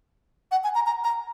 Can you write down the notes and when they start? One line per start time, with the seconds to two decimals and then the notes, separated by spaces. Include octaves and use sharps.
0.51 F#5
0.64 G#5
0.75 A#5
0.86 A#5
1.04 A#5